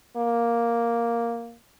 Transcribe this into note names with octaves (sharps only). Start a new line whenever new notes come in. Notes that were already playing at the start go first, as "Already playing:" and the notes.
A#3